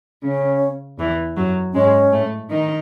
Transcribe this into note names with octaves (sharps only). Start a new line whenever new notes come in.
C#3 C#4
E2 E3
F#2 F#3
G#2 G#3 C#4
A2 A3
D#3 D#4